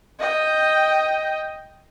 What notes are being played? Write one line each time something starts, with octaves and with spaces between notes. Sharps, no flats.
D#5 G5